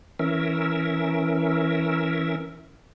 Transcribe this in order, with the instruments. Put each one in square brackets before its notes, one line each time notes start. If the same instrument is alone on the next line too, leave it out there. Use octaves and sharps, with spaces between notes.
[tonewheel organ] E3 C#4 A#4 E5